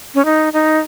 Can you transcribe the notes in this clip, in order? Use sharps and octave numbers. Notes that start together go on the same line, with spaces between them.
C#4
D#4
D#4